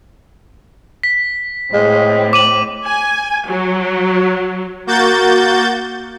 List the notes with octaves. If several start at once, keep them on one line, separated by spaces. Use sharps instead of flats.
B6
A2 G#3 C4
D6 D#7 F#7
G#5
F#3
A#3 F#4 G6 A6